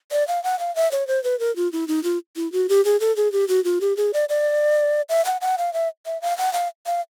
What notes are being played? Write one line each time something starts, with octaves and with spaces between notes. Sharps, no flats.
D5
F5
F#5
F5
E5
C#5
C5
B4
A#4
F4
E4
D#4
F4
E4
F#4
G4
G#4
A4
G#4
G4
F#4
F4
G4
G#4
D5
D5
E5
F#5
F#5
F5
E5
E5
F5
F#5
F5
F5